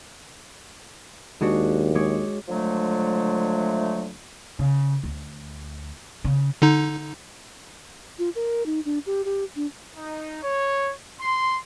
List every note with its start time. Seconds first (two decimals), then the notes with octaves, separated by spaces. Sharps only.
1.41 D#2 G#3 D4 F#4
1.95 G#3 C#5 D6
2.48 D3 F3 F#3 G#3 A3
4.59 C#3
5.04 D2
6.24 C#3
6.62 D3 D#4
8.19 F4
8.35 A#4
8.66 D#4
8.85 D4
9.06 G4
9.25 G4
9.56 D4
9.97 D#4
10.43 C#5
11.20 C6